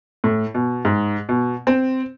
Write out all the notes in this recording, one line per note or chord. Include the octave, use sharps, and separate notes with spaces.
A2
B2
G#2
B2
C4